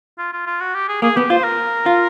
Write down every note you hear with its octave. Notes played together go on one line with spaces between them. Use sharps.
F4
F4
F4
F#4
G4
G#4
A#3 G#4
B3 G4
F4 C5
A#4
F4